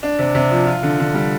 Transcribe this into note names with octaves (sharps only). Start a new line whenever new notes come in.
D4
C3
C3
F3
F4
D3
D3
G3